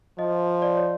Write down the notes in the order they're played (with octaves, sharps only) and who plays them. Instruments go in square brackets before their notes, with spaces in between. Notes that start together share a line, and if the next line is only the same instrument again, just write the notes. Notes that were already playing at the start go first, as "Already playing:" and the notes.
[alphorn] F3 [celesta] D#5
[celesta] D5
C#5